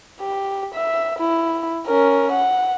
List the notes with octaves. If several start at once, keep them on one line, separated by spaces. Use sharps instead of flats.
G4
E5
E4
C#4 A#4
F#5